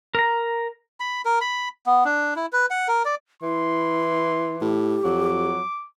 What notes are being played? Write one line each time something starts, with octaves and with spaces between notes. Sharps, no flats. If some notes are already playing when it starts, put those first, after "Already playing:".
A#4 A#5
B5
A#4
B5
B3
D4
E4
B4
F#5
A#4
D5
E3 E4 C6
A2 G4
F2 F#3 D6